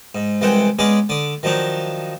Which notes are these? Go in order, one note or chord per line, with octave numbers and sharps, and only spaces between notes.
G#2
C2 E3 G#3 F#5 G5
G#3 B3 C#4 G#4 D5
D3 D5 D#6
D#3 F3 F#3 D4 D#4